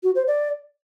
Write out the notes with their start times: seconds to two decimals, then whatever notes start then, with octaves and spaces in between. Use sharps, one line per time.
0.03 F#4
0.15 C5
0.27 D5